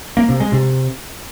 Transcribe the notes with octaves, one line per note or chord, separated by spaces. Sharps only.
A#3
C3
G#3
C3